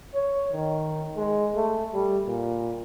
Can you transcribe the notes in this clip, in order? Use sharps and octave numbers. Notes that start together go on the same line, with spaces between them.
C#5
D#3
G#3
A3
G3
A#2